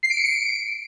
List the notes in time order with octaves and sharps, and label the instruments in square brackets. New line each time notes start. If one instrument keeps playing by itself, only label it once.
[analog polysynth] C7
D7
C#7
D7